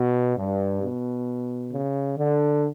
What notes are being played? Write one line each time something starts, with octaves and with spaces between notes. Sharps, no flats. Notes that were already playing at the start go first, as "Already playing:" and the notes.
Already playing: B2
G2
B2
C#3
D3